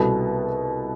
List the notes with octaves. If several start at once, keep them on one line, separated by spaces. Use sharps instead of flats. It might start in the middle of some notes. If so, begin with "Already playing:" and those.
Already playing: C2 B2 B3 A4